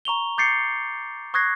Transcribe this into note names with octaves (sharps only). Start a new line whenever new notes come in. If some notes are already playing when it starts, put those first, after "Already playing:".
A#5 C#6 F7 G7
D6 G6 A6 C7 C#7
C#6 D#6 F#6 G#6 A#6 C7